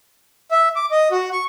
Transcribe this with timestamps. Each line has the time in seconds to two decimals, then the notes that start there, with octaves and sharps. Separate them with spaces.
0.51 E5
0.76 D6
0.91 D#5
1.12 F#4
1.32 C#6